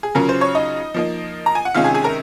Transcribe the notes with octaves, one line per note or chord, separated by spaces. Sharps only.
G#4
C#3 F#3 C#4 F4 A#4
C5
C#5
D#4 D#5
F3 A#3 D#4
A#5
G#5
F#5
C3 D#3 G#3 C#4 F4 F5
G#4 G#5
G#4 G#5
A#4 A#5